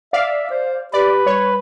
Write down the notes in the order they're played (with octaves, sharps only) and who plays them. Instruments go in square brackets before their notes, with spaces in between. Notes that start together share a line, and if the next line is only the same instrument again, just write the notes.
[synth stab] D5 F5 [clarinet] E5
[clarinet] C5
[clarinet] G4 [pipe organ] B4 [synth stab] D5
[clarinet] G3 [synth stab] C#5